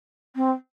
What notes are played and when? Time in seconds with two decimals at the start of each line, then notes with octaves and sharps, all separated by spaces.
0.36 C4